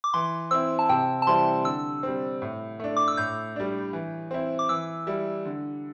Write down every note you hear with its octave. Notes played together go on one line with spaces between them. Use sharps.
D6
E3 C6
C4 E4 E6
A5
C3 G5
A5
E3 G3 C4 E4 C6
D3 E6
G3 C4
A2
A3 D4
D6
E6
A2 G6
G3 D4
E3
C4 E4
D6
E3 E6
G3 E4
D3